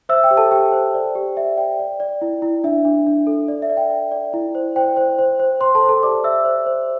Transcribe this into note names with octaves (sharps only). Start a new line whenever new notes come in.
C5 E5 E6
G5
G4
A4 A5
G4 G5
C5
D5
G4
D5 E5
D5 G5
D5
D5
E4
E4
D4 E5
D4
D4
A4
D5
E5
D5
G5
D5
D5
E4
C5
C5 G5
C5
C5
C5
C5 C6
A4 A5
C5
A4 A5
G4 D5 D6
C5 E5 E6
C5
C5